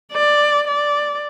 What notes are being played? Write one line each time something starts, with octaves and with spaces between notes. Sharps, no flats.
D5
D5